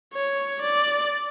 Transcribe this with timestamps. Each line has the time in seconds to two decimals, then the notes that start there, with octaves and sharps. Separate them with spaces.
0.14 C#5
0.61 D5